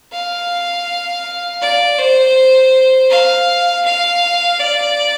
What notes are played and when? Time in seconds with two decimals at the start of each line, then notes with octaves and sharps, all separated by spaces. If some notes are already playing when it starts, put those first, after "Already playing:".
0.12 F5
1.61 D5
1.99 C5
3.10 F5
3.85 F5
4.60 D5